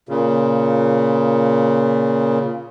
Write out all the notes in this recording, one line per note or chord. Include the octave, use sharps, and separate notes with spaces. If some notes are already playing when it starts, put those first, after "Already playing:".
A#2 C#3